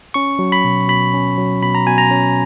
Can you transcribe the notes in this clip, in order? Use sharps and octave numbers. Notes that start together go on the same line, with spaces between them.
C#4 C#6
F#3
B5
B2
B2 B5
C#4
F#3
B2 B5
A#5
B2 G#5
A#5
C#4